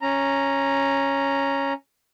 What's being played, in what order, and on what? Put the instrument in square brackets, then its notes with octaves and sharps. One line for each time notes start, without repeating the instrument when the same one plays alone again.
[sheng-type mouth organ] C#4 A#5